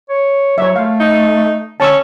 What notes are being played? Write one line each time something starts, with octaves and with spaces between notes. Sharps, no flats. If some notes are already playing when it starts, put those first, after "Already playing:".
C#5
F#3 C#5 E5
A3 F5
D#4
D3 C#4 A5 C#6 E6